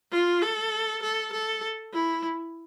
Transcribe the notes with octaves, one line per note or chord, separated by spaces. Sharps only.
F4
A4
A4
A4
E4